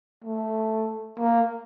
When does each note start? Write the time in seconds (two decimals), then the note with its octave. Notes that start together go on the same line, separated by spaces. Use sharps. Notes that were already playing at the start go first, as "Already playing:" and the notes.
0.24 A3
1.19 A#3